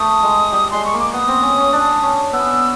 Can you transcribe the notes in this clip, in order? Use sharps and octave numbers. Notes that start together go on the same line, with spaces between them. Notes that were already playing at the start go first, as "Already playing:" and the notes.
Already playing: A3 D#6
G#3
G3
G#3 C6
C#6
A#3
D6
B3 D#6
C4
C#4
C#4
D4
C#4
B3 E6